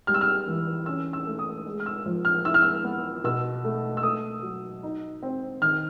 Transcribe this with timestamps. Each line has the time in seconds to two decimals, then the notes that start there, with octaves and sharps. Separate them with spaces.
0.07 G3 F6
0.14 E6
0.21 F6
0.47 E3
0.86 C#4 E6
1.13 E6
1.27 A3
1.39 D#6
1.66 G#3
1.80 F6
1.86 E6
2.06 F3
2.25 F6
2.45 E4 E6
2.54 F6
2.63 E6
2.84 B3
3.24 B2 E6
3.64 A3
3.97 E6
4.03 A3 D#6
4.43 F#3
4.83 D#4
5.23 C4
5.62 D#3 F6